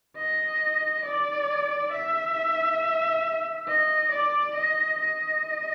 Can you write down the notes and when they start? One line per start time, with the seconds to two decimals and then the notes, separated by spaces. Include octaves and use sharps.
0.17 D#5
1.05 D5
1.92 E5
3.68 D#5
4.12 D5
4.55 D#5
4.99 D#5